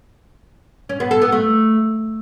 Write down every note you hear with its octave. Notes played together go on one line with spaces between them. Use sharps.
C#4
B3
A4
B3
A3